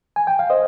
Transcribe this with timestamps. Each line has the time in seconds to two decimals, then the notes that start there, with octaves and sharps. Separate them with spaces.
0.16 G#5
0.27 G5
0.39 F5
0.50 C5 D#5